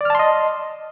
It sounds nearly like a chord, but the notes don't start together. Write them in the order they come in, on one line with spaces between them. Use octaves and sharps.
D5 F6 A5 C6 D#5